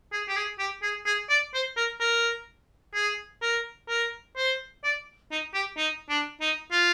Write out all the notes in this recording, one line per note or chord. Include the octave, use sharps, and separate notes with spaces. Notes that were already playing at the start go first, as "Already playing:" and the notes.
G#4
G4
G#4
G4
G#4
G#4
D5
C5
A#4
A#4
G#4
A#4
A#4
C5
D5
D#4
G4
D#4
D4
D#4
F4